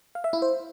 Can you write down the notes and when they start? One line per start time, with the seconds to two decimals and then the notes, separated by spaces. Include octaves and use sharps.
0.15 F5
0.24 E5
0.33 E4
0.42 C5